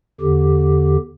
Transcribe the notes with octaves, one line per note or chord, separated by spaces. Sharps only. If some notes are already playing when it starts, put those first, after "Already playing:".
E2 D3 G4